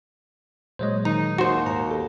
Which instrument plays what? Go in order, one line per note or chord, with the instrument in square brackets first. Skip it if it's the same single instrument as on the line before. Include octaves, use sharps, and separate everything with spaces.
[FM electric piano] A#2 F#3 G#3 [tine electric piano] C5 C#5 D#5
[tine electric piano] D#3 [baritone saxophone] D#4 [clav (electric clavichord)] A#5
[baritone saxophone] D#2 [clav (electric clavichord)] F#4 C5 [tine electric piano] C6 C#6
[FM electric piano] G#2 [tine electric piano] A#5
[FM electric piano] G4 A4